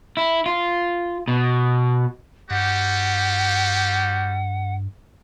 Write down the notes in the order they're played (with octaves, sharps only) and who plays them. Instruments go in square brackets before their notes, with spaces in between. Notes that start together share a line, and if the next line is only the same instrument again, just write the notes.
[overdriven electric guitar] E4
F4
B2
[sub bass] G2 [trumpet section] G3 F#4 G4 [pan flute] F#5